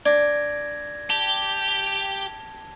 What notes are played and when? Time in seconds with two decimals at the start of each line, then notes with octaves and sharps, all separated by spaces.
0.06 D4 G#6 A#6
1.10 G4 A5